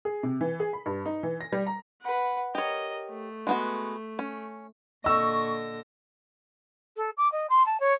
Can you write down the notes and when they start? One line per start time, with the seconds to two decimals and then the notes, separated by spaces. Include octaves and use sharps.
0.05 G#4
0.23 C3
0.41 E3
0.60 G#4
0.73 B5
0.86 G2
1.05 D#4
1.23 E3
1.41 A#6
1.52 G3
1.67 A#5
2.01 B4 F#5
2.55 G4 A#4 C#5 D#5
3.10 A3
3.47 G#3 B3 F#4
4.19 C#4
5.04 A#2 D3 D#5 C#6 E6 A#6
6.97 A4
7.17 D6
7.32 D#5
7.50 C6
7.66 A5
7.80 C#5